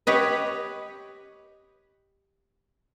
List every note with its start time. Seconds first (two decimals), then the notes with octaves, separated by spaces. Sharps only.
0.07 G4 B4 C#5 D#5